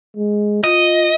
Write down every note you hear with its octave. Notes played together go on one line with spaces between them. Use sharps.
G#3
F4 D#5